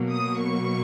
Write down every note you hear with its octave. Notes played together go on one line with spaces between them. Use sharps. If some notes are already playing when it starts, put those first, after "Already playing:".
Already playing: B2 F#3 A#3
D#6
C#6